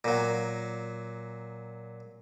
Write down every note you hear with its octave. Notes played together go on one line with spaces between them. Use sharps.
A#2 F#3